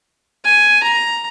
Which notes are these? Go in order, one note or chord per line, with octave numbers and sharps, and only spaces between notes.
G#5
A#5